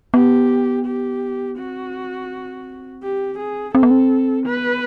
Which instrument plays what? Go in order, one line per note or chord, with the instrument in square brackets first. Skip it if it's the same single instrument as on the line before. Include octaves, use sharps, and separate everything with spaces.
[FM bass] B3 [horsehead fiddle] G4
[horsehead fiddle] G4
[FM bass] C4 [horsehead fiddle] F#4
[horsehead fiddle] G4
G#4
[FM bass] C4 [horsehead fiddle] A4
[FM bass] B3
C4
[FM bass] B3 [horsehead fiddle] B4